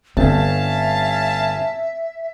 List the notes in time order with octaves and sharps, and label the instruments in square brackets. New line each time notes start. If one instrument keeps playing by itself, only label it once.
[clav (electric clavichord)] G1 [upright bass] C4 [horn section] C#4 F5 A5 [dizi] E5